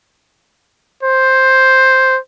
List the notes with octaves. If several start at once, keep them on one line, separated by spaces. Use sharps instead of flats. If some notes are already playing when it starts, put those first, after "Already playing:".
C5